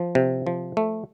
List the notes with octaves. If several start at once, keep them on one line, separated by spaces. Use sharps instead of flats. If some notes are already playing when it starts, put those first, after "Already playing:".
Already playing: F3
C3
F3
A3